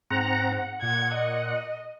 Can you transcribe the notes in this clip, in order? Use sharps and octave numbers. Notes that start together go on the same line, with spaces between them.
G#2 C4 F#5 A#5
F#5
A#2 G#6
D#5